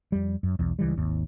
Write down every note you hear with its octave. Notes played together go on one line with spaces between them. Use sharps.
F2 G3
F#2
B1 E2
C#2 E3 G3
G#1 D#2